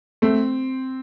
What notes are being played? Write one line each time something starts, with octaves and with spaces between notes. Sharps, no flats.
A3 C4